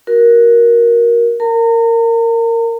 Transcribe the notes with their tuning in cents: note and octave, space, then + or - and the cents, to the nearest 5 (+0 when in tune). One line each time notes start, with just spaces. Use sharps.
F#4 +0 A#4 +10
A#4 -15 A#5 -40